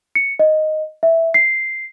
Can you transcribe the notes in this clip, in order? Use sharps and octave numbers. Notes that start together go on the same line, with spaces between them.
C#7
D#5
E5
C7